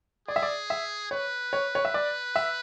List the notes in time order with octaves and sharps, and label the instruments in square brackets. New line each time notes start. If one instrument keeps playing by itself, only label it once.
[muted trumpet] G#4 [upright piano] D5
[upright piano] E5
D5
E5
[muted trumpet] B4 [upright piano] C#5
[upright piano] C#5
C#5
E5
D5
E5